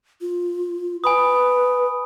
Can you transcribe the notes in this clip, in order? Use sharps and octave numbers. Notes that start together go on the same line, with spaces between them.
F4
B4 G#5 B5 D#6